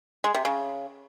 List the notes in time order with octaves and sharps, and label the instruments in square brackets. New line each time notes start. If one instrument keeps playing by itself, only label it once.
[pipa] G#3
C3
C#3